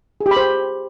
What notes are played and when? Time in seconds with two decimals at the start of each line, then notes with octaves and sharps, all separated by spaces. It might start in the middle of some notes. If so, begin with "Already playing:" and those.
0.21 G#4
0.26 G4
0.31 B5
0.37 C5